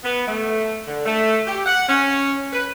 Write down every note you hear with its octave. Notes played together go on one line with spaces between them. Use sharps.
B3
A3
D3
A3
G4
F#5
C#4
B4